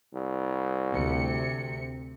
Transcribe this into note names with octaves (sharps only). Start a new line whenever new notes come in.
C2
D2 C3 C#7